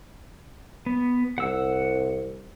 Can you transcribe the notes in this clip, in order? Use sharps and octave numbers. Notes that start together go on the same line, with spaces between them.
B3
C2 F#5 E6